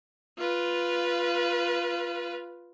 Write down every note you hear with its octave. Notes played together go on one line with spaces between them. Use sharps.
F4 B4